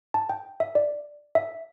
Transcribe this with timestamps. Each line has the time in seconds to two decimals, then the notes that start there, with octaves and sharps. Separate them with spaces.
0.14 A5
0.29 G5
0.60 E5
0.75 D5
1.35 E5